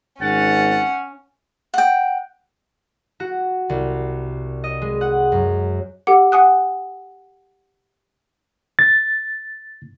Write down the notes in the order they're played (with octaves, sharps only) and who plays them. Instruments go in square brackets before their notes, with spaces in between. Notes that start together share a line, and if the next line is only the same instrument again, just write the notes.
[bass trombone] G#1 [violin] C#4 [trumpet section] F#5 [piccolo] A6
[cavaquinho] F#5 G5
[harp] F#4
C2
D#5
G#3
F#5
F#2
[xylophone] G4 A4 F#5 D6 C#7
F#5 G#5 D#6 F#6
[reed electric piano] A6